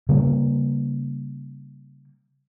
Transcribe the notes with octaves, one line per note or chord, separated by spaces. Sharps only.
C#3 G3 A#3